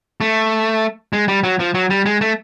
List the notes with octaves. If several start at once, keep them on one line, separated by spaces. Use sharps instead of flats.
A3
G#3
G3
F#3
F3
F#3
G3
G#3
A3